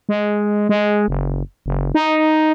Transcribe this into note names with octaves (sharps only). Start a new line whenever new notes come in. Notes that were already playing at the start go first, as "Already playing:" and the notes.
G#3
G#3
F#1
F#1
D#4